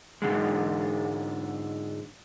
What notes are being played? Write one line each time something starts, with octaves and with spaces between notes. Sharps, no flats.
G#2 D3 G#3